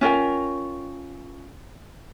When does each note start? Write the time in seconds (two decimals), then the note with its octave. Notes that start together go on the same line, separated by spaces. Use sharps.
0.01 C#4 F4 A#4 G5